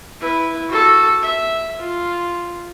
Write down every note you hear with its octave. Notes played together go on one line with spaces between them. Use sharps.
E4 B4
F#4 A4
E5
F4